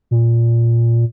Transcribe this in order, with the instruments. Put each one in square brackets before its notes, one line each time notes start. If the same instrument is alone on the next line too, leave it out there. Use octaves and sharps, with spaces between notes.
[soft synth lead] A#2